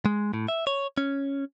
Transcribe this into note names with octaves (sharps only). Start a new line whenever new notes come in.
G#3
A2
E5
C#5
C#4